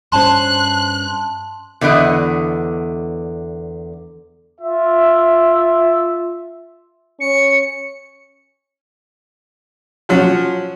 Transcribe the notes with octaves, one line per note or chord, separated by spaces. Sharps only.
G2 C#4 C5 A5 C6 F#6
E2 D3 B3 D5 D#5
F4 E5
C#4 C#7
F3 F#3 C#4